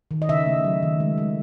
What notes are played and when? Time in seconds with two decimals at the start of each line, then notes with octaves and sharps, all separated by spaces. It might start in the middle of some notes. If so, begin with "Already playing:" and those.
0.11 D#3
0.22 D#5
0.29 C#3 E5
0.46 A3
0.64 F#3
0.83 D#3
1.00 G#3
1.18 G#3